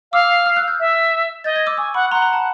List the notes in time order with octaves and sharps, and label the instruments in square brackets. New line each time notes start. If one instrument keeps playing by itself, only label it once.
[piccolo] F5 [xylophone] D6 E6
[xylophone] D#6 F6
E6 F#6
F6 G6
[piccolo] E5
[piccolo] D#5 [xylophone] G6 A6
[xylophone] G#6 A#6
D6 E6
[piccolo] G#5 [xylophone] C#6 D#6
[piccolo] F#5 [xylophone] B5 C#6
[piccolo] F#5 [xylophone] A#5 C6
[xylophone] A#5 C6
A5 B5